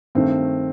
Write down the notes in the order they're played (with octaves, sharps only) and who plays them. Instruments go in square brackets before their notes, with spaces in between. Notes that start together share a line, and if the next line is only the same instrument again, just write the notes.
[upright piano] G2 D#3 A3 [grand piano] C4